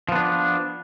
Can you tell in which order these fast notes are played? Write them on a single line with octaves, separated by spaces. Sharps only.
F3 B3 D4